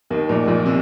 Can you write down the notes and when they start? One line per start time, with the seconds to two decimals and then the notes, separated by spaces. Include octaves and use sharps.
0.10 D#2 D#3
0.29 A#1 A#2
0.47 A#1 A#2
0.66 C3